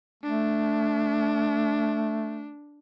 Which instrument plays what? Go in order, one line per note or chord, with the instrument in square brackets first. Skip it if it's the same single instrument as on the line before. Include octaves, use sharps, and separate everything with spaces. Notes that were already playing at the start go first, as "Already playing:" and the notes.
[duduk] A3 [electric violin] D4